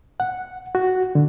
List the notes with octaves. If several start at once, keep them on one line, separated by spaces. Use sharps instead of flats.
F#5
F#4
D3